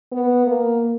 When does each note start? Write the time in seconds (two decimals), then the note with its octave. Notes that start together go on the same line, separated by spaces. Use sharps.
0.12 B3
0.47 A#3